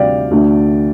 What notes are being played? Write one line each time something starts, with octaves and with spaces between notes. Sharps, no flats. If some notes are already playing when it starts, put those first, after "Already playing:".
Already playing: D2 C3 G3 D4 D5 F5 G5
D2 D3 A3 D4